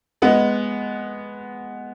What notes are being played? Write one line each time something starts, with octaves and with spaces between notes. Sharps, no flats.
G#3 B3